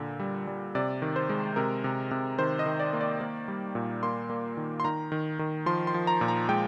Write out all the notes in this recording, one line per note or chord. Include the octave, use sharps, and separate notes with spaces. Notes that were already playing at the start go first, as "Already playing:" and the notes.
Already playing: A#2 D3
G3
G3
C3 D5
D#3
C5
G#3
C3 A#4
C3
C3
D#3 C5
D#5
D#3
D5
A#3
D5
A#3
G3
A#2
A#3 C6
A#3
D#3
C6
D#3 A#5
D#3
D#3
F3 C6
C6
F3
A#5
A#2
A#5
G#3 G5